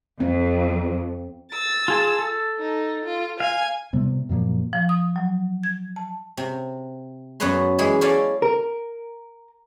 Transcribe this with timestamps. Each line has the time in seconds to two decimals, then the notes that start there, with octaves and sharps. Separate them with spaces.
0.20 F2 C4
1.51 E6 A6
1.88 F4 G#4 A5
2.19 A4
2.59 D#4
3.05 F4
3.40 F5 G#5
3.93 A2 C3 G3 B3
4.29 F#2 A#2 F3 A#3
4.73 F3
4.89 D#6
5.16 F#3
5.64 G#6
5.96 A5
6.37 C3
7.40 F#2 B3 F#4 B4 C#5 C6
7.78 E3 G#3 E4 G#4
8.01 C#4 E4 A4 D5 F5 G#5
8.42 A#4